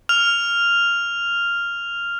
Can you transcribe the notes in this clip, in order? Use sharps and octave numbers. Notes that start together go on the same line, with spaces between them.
F6 F7